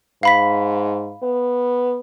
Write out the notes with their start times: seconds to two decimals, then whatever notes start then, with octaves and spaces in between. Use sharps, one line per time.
0.23 G#2 F5 B5 B6
1.23 B3